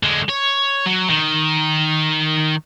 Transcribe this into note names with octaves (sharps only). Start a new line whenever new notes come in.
D3 G#3
C#5
F#3
D#3